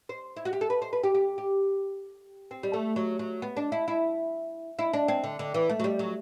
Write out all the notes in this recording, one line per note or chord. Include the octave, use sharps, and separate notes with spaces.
C5
E4
F#4
G4
A4
B4
C5
B4
G4
G4
G4
C4
G3
A3
F#3
F#3
B3
D4
E4
E4
E4
D4
C4
D3
D3
E3
A3
F#3
G3
F#3